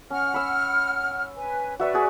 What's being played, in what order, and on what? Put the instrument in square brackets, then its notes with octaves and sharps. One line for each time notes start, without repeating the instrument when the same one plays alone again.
[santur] C#4 [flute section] F#5 F6
[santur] B5 E6
[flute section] B4 G#5
[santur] F#4 E5 C#6 [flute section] B4 D5
[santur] F#4 G#4